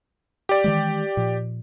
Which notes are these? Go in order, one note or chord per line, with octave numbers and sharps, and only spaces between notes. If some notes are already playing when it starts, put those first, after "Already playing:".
G4 D5
D#3 E3 G#3
A#2 F3